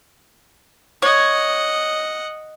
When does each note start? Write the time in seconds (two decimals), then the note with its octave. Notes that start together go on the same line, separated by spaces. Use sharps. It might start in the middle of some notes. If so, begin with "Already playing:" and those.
1.02 C#5 D#5 F#5